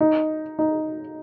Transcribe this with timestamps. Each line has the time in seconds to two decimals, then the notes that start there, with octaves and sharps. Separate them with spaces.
0.01 D#4
0.59 D#4